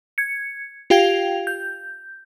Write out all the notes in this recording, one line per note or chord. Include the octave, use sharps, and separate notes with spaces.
G#6 C#7
F4 G4 F5 G5 G#6 F7
G6